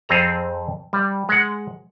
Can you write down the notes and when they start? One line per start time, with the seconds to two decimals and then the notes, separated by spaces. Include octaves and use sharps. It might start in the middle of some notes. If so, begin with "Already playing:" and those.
0.09 F2 C4 G#4 A4 A#5
0.93 G3
1.29 G#3 F#5